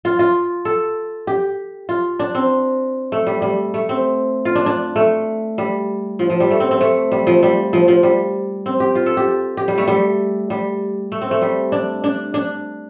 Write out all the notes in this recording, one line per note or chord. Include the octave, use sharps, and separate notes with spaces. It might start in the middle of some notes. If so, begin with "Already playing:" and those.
F4
F4
A4
G4
F4
D4
C4
A3
G3
G3
A3
C4
F4
D4
D4
A3
G3
F3
F3
G3
A3
C4
C4
A3
G3
F3
G3
F3
F3
G3
C4
G4
F4
A4
G4
G4
G3
A3
G3
G3
A3
C4
A3
G3
D4
D4
D4